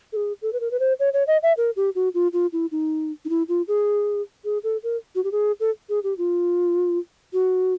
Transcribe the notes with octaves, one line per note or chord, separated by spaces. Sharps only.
A4
G#4
A4
B4
A#4
B4
C5
C#5
C#5
D#5
E5
A#4
G4
F#4
F4
F4
E4
D#4
D#4
E4
F4
G#4
G#4
A4
A#4
F#4
G4
G#4
A4
G#4
G4
F4
F#4